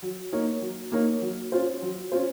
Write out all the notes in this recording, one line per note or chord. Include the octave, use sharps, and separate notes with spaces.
F#3
A#3 D#4 A#4 C#5
F#3
A#3 D#4 A#4 C#5
F#3
C#4 F4 C5
F#3
C#4 F4 C5